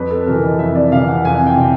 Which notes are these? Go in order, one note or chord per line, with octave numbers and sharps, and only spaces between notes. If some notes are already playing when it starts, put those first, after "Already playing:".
Already playing: F2 B4
A4
C3 E3 A#4
D#5
F2 E5
D5
C3 E3 F5
F#5
F2 G#5
G5
C3